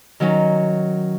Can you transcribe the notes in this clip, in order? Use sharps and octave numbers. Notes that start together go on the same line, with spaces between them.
D#3 F#3 C#4